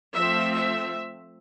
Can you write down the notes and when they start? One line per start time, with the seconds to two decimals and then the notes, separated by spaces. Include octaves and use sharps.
0.14 F3 A3 C4 E5
0.54 E5